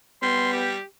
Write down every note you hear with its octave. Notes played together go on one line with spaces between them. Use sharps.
G3 B3 C6
G4